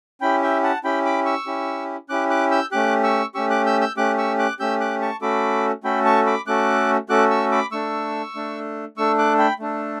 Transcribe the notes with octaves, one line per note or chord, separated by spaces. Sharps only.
C#4 E4 G4 G5 B5
E5 G5
F#5 A5
C#4 E4 G4 G5 B5
B5 D6
C#6 E6
C#4 E4 G4
C#4 E4 G4 D6 F#6
D6 F#6
E6 G6
A3 C#4 G4 D6 F#6
C#6 E6
A3 C#4 G4 C#6 E6
D6 F#6
E6 G6
E6 G6
A3 C#4 G4 D6 F#6
C#6 E6
D6 F#6
A3 C#4 G4 E6 G6
D6 F#6
A5 C#6
A3 C#4 F#4 A4 B5 D6
A3 C#4 F#4 A4 G5 B5
A5 C#6
B5 D6
A3 C#4 F#4 A4 D6 F#6
A3 C#4 F#4 A4 D6 F#6
C#6 E6
B5 D6
A3 D4 A4 C#6 E6
A3 D4 A4
A3 D4 A4 C#6 E6
D6 F#6
G5 B5
A3 D4 A4